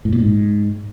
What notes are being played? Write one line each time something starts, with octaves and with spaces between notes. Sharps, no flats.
A2
A#2
G#2